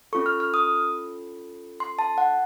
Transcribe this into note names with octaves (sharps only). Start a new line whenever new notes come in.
C#4 F4 A4 C#6
F6
F6
D#6
C6
A5
F#5